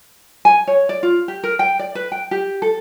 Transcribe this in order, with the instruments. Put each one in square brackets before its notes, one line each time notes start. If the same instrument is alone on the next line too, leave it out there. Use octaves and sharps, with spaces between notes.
[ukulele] G#5
C#5
D5
F4
G4
A#4
G5
D5
B4
G5
G4
A4